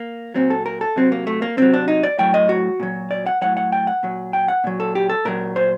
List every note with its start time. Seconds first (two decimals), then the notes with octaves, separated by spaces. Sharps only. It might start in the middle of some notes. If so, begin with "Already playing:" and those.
Already playing: A#3
0.34 A#2 F#3 C4
0.50 A4
0.66 A#4
0.81 A4
0.96 C3 F#3 C4
1.12 A#3
1.27 A3
1.42 A#3
1.57 C3 F#3 C4
1.74 D4
1.88 D#4
2.03 D5
2.19 A2 F#3 G5
2.34 D#5
2.49 F#4
2.80 A#2 F#3
3.11 D5
3.26 F#5
3.42 A2 F#3 F#5
3.57 F#5
3.72 G5
3.87 F#5
4.03 A#2 F#3
4.33 G5
4.48 F#5
4.64 A#2 F#3
4.80 A4
4.95 G4
5.09 A4
5.25 A#2 F#3 A#4
5.56 C5